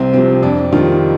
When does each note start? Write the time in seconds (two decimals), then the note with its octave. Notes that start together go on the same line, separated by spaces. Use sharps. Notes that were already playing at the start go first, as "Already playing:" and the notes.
Already playing: C2 C4
0.14 C3 F3 C4
0.43 F2 D4
0.73 D#3 G3 F4